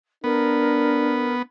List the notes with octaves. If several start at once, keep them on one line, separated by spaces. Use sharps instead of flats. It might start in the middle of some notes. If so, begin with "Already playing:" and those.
B3 D4 A#4